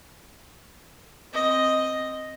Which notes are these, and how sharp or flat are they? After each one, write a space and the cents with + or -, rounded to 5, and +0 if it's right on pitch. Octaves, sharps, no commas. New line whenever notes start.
C4 +0 D#5 +0